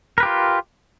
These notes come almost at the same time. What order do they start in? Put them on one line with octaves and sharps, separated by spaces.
A#4 B4 G4 F4